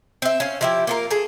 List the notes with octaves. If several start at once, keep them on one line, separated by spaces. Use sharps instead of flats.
C4 E5
C#4 F5
F3 E4 G4
A#3 F4 A#4
G#4 A4